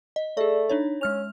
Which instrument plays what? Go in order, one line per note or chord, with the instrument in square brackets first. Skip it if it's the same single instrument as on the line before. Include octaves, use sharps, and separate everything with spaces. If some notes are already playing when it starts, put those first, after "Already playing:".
[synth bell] D#5
[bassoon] A3 [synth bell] G#4 D5
[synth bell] D4 D#4 C#5
[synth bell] G#3 F6 F7 [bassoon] C#4